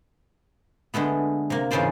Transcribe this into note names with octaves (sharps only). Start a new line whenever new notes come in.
D3 G#3 A3 B3
C3 A#3
E2 G#2 C#3 F4 C5 D5